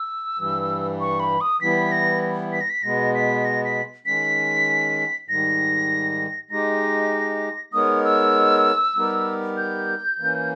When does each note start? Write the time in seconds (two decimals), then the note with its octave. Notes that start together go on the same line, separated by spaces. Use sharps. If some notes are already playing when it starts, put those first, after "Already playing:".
Already playing: E6
0.39 G2 E3 G3
1.00 C#6
1.20 B5
1.41 D#6
1.61 E3 G3 B3 E4 B6
1.92 A#6
2.53 B6
2.61 A#6
2.70 B6
2.83 B2 G#3 B3 A#6
3.15 B6
3.45 A#6
3.65 B6
4.06 D#3 G#3 C#4 B6
5.28 G#2 D#3 G3 A#6
6.51 G#3 D#4 G4 A#6
7.73 G#3 B3 D#4 A#4 C#5 D#6
8.05 E6
8.96 G3 B3 D#4 G4 A#4
9.57 G6
10.19 E3 A#3 C#4